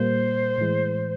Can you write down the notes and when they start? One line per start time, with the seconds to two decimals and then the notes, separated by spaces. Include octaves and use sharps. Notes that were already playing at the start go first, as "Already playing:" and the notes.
Already playing: A#2 G3 A#3 C5
0.58 A2 E3 G#3